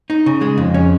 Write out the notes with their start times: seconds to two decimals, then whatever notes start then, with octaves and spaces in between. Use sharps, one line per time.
0.10 D#4
0.26 C#3
0.41 G#3
0.58 F2
0.74 C#4